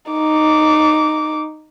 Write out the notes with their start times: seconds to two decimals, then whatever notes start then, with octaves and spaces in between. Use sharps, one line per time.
0.11 D#4 D6